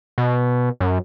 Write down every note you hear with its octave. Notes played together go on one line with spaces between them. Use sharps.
B2
F#2